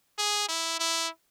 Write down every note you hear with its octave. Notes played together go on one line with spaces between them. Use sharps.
G#4
E4
E4